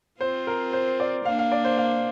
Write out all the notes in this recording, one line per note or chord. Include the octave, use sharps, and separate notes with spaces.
C4 F4 C5
A#4
C5
D5
A#3 D4 F5
F5
D5
C5
F5